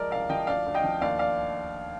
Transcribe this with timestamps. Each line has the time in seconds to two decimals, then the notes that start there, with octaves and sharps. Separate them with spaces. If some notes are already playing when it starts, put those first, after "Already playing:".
Already playing: F3 G#3 A#4 D5
0.11 C2 D5 F5
0.29 F3 D#5 G5
0.47 D2 D5 F5
0.66 D2
0.74 D#5 G5
0.83 F3
1.01 D#2 D5 F5
1.19 D5 F5